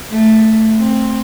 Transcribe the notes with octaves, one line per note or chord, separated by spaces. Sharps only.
A3
C4